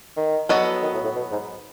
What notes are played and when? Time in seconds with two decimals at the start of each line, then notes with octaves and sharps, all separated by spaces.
0.17 D#3
0.49 F#3 B3 F#4 A4 D#5
0.83 D#3
0.94 A2
1.04 A2
1.16 B2
1.32 G#2